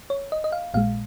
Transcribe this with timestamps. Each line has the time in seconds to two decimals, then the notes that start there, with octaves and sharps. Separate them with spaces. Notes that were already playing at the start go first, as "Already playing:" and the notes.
0.10 C#5
0.32 D#5
0.44 D#5
0.52 F5
0.74 A#1 A#2 G#3 F5